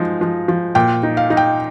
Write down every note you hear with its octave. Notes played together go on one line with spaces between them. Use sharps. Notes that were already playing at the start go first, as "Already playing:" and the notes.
Already playing: F3 G#3 D#4
F3
F3
A#2 G5
D#4
F5
D#4
G5